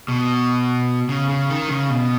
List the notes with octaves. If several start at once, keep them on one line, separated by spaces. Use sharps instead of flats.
B2
C#3
C#3
D#3
C#3
B2